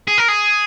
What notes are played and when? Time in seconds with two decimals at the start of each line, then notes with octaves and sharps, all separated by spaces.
0.07 G#4
0.18 A#4
0.28 G#4